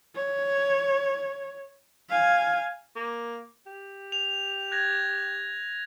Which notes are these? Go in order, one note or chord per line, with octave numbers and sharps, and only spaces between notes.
C#5
F5 G#5
A#3
G4
F7
F#6 G#6 A#6